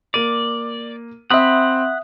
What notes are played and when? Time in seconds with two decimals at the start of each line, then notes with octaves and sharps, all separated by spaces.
0.14 A#3 D5 D#7
1.30 C4 E5 F#5 B5 D#6